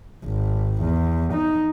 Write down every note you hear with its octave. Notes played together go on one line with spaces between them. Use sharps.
G#1
E2
D#4